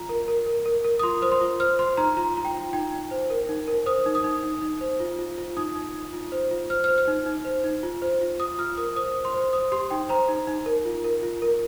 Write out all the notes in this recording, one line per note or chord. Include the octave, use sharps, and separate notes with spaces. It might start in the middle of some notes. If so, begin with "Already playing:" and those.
Already playing: F4 A#5
A#4
A#4
A#4
A#4
A#4
D#6
F4 C6
C5 D#6
C6
F4
C5 F6
C5 C6
D#4 A#5
F4 A#5
F4 A#5
G5
F4
D#4 G5
D#4
C5
A#4
D#4
A#4
C5 D#6
D#4
D#6
D#4
D#4
D#4
C5
F4
F4
F4
D#4 D#6
D#4
D#4
F4
C5
F4
C5 F6
C5 F6
F6
D#4
D#4
C5
D#4
F4
C5
F4
F4 D#6
F4 F6
A#4 D#6
C5 D#6
C5
C6
C5
C5 D#6
G4 C6
D#4 G5
C5 A#5
D#4
D#4
A#4
F4
A#4
F4
A#4